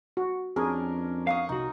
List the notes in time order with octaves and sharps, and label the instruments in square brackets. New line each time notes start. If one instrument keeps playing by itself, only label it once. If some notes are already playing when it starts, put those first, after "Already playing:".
[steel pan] F#4
[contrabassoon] F2 [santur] C#4 D4 A#4 [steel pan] G#4
[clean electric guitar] F5 [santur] F#5 C#6 D#6
[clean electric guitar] C2 F#4 [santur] D#4